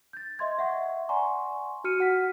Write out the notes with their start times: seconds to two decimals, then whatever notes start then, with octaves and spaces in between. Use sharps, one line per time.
0.13 G6 A6
0.39 D#5 E5 C6 G#6
0.58 E5 F#5 C#6
1.09 D5 F#5 G#5 A#5 C6 C#6
1.84 F#4 F6 C#7 D#7
1.99 F#4 F#5 F6 B6